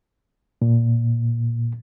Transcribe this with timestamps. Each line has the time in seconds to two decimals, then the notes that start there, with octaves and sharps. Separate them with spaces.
0.62 A#2